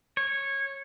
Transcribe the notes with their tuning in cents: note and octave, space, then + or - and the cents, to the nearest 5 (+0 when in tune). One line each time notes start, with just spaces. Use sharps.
C#5 -15